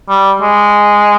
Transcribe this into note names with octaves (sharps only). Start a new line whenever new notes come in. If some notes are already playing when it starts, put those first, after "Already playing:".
G3
G#3